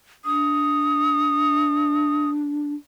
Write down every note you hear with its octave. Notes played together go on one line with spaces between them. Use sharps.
D4 D#6